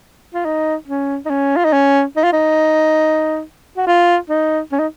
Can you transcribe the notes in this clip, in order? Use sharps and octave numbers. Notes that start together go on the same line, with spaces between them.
F4
D#4
C#4
D#4
C#4
F4
D#4
C#4
D#4
F4
D#4
F#4
F4
D#4
C#4
D#4